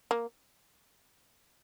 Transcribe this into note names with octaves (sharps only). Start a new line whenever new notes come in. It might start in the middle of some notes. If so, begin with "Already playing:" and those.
A#3